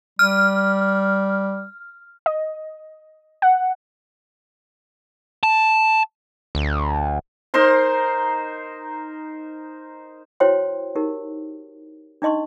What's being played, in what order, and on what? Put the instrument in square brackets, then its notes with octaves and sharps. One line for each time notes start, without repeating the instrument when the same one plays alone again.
[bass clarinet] G3 [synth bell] F6
[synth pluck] D#5
F#5
[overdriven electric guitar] A5
[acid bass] D2
[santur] D#4 A#4 C5 C6
[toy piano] E4 F#4 C5 C#5 G5 C6
D#4 G4 A#4
D4 D#4 D#5 C6 C#6